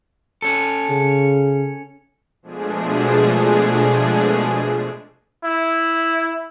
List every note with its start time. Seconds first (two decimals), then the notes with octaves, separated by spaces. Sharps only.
0.42 C#4 A4
0.90 C#3
2.42 B2 F3 G#3 A3 D4 G#4
5.44 E4